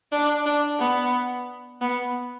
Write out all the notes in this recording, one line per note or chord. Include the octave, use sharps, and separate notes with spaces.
D4
D4
B3
B3